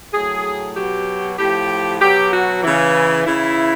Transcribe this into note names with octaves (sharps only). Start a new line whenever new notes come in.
A2 F#3 G#4
B2 F#3 G4
A2 F3 G4
B2 F#3 G4
F#4
C#3 E3
C#3 E3 E4